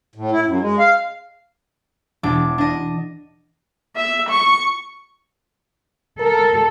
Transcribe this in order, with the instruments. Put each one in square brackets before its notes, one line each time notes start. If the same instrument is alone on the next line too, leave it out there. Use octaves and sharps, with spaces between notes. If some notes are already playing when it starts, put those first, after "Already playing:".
[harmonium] A2
E4
F#2
G#3
F5
[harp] E1 D4 D6
D4 D#5
[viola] E5
C#6
[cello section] A4 [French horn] A#4